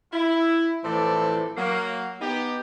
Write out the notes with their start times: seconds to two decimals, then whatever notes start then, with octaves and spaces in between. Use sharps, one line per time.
0.13 E4
0.84 A2 E3 F3 C4 A4 D5
1.57 F#3 A#3
2.21 B3 D#4 G4